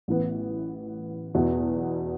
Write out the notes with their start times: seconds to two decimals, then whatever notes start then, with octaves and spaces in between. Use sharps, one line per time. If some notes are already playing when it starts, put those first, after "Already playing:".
0.08 A1 A2 E3 B3
1.34 E2 B2 B3 E4